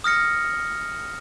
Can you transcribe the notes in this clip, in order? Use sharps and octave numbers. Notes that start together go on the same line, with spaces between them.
D#6 F6 A#6 C#7